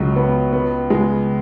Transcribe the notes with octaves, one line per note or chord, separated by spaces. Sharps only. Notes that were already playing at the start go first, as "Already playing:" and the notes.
Already playing: C#2 F#3
B3
B3
G#3